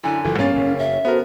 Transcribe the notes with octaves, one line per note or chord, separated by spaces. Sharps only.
F#2 D3 E4 G#5
F#1 E3 F3 A4
G2 A#3 B3 C#4 C#5 F5 A6
F#1
E5
B3 F#4 A4 A#4 C5